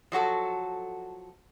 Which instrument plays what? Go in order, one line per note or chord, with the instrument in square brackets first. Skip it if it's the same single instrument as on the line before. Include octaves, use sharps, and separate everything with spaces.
[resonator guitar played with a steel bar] F3 F#3 F#4 A4